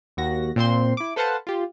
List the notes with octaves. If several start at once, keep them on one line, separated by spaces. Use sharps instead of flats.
D#2 F#4 A#6
A#2 C4 C5 C6
E4 D6
A4 B4 C5 F5 F#5 A5
F4 G4